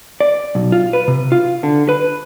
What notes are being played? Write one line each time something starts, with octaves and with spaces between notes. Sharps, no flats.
D5
B1
F4
B4
C3
F4
D3
B4